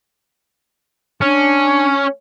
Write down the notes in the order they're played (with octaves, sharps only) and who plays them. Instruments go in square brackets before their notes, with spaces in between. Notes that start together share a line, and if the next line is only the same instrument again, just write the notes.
[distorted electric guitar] C#4 [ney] D4